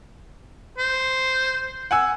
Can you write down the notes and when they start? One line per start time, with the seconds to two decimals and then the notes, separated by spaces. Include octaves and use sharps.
0.78 C5
1.91 F#5 G#5 E6